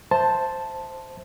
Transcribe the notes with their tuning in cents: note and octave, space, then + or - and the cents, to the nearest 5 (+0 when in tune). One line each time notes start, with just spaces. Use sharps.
C5 +0 E5 +5 A5 +0